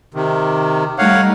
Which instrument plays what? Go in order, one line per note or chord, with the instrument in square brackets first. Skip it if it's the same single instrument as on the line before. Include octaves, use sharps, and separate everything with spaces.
[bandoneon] C3 D#3
[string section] G3 A3 D#4 [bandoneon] C#5 F5 F#5